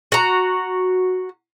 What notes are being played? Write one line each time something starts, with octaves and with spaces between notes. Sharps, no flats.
F#4 A#5